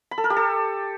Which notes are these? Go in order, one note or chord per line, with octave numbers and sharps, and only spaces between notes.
B5
A4
A#4
G4
A4